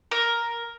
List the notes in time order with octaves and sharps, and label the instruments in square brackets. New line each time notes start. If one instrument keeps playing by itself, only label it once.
[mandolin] A#4